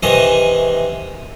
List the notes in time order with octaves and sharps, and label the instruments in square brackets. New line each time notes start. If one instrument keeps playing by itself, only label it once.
[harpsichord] C3 D#3 E3 D#5 G#5 D#6